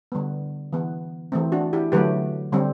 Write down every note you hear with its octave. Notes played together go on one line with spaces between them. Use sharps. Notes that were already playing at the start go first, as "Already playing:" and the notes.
D3 G3 B3
E3 B3
E3 A3 C4
D4 F#4
E4 G4
D3 F#3 A3 G4 B4
D3 G3 C4